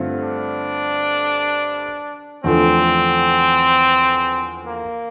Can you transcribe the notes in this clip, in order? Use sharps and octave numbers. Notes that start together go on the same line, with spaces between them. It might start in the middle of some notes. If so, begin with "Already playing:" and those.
Already playing: G2 D3 A3 C4 F4
D4
E2 D3 F3 A3 C4
A#3